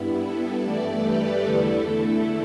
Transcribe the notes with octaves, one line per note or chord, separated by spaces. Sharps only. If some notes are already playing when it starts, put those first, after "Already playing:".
Already playing: G2 G3 B3 E4
E4 A4
G2 E3 A3 A4 D5
G4 B4
E2 D3 A3 E4 A4
E4 A4